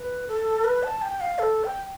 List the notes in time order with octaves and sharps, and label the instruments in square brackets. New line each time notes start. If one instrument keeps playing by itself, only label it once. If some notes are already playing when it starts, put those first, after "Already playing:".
Already playing: [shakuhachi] B4
A4
B4
A5
G5
F5
A4
G5